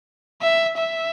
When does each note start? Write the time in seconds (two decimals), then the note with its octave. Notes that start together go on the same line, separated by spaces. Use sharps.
0.42 E5
0.77 E5